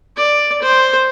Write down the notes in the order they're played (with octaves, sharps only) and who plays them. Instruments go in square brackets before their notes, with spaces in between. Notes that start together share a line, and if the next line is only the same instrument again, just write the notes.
[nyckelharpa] D5
C5